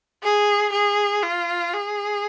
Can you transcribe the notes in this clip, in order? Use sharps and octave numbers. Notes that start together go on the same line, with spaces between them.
G#4
G#4
F4
G#4